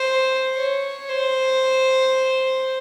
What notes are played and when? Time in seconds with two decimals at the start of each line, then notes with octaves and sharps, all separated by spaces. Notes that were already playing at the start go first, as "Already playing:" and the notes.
Already playing: C5
0.57 C#5
1.09 C5